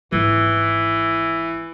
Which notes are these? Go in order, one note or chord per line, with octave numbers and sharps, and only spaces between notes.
G#1 E3